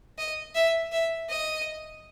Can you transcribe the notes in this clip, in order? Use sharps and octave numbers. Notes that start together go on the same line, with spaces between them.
D#5
E5
E5
D#5